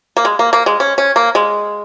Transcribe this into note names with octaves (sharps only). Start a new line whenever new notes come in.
A#3
G#3
A#3
A#3
G#3
C#4
C#4
A#3
G#3